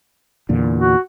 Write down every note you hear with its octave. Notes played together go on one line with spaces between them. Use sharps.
E2 A#2 D3
F#4